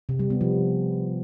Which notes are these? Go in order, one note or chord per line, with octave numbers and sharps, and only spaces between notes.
C3
G3
B3
F3